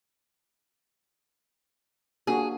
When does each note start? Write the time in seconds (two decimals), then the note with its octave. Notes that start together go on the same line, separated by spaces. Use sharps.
2.27 A#3 D4 F#4 G#4